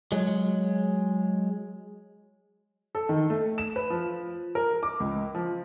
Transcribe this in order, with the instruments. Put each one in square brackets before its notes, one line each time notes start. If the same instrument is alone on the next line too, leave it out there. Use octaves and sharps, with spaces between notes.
[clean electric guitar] F#3 G#3
[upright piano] A4
D#3
A3
E7
B4
F3
A#4
D6
C#2
F3